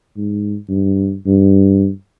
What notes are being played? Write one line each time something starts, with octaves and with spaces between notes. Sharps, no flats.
G#2
G2
G2